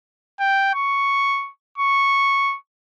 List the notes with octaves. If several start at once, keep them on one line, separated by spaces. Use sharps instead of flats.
G5
C#6
C#6